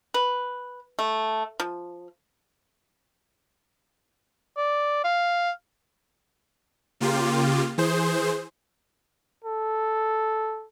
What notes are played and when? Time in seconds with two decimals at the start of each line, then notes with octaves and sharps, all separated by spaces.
0.14 B4
0.99 A3
1.60 F3
4.57 D5
5.04 F5
7.00 C#3 A#3 F4 G4
7.78 E3 G#4 C5
9.44 A4